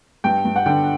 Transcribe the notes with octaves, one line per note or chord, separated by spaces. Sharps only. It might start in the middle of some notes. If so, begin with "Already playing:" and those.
G2 G5
G2
F#5
D3 G5